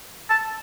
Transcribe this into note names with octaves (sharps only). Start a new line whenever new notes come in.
A5